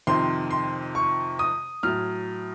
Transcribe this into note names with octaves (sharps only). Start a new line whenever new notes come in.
F2 C3 D#3 C6
C6
C#6
D#6
A2 F#3 F6